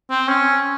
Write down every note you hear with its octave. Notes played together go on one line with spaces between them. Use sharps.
C4
C#4